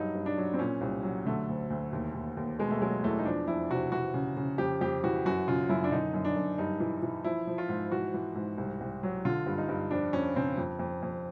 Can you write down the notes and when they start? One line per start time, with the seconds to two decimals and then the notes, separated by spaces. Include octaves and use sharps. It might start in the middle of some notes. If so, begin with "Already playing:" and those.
Already playing: G2 F#3 D#4
0.14 G2
0.26 D4
0.38 F#3
0.54 C4
0.59 A#2 C#4
0.81 C2
1.03 F#3
1.25 D3 A3
1.49 D2
1.70 D2
1.93 D#2
2.14 D#2
2.37 D#2
2.59 B2 G#3
2.71 A3
2.81 F#3 G#3
3.04 E2 A3
3.19 D#4
3.25 F3 D4
3.47 F2 E4
3.70 C3 F#4
3.92 E3 F#4
4.14 C#3
4.37 C#3
4.58 F2 G4
4.81 F2 G4
5.04 E3 F#4
5.25 F#2 F#4
5.48 C#3 F4
5.69 F#2 E4
5.84 D4
5.91 D3 D#4
6.14 F#2
6.25 D4
6.36 F#2
6.58 G2 D#4
6.80 E3
7.02 E3
7.24 F3 E4
7.47 F3
7.58 F4
7.69 G#2
7.92 E3 F#4
8.14 E3
8.35 G#2
8.58 C2
8.80 C2
9.03 F#3
9.25 D3 F4
9.46 G2
9.58 D#4
9.69 G2
9.91 F2 D4
10.13 F2 C#4
10.36 C#3 C4
10.58 F2
10.79 F2
11.03 F2